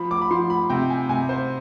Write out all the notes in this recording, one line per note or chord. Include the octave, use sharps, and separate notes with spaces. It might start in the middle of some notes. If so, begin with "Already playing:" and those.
Already playing: F3 B5
D6
B5
F3 C6
B5
C3 G5
G#5
C3 G#5
C5